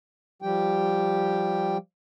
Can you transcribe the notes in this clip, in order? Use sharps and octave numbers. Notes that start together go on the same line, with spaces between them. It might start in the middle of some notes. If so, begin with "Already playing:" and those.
F3 G3 G4 G5